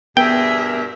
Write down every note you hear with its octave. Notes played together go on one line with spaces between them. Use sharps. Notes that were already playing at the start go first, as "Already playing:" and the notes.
G2 B2 B3 G#4 A#4 E5 G5